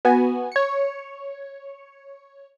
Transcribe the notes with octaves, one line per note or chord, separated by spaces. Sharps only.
B3 F#4 G#5
C#5 C#7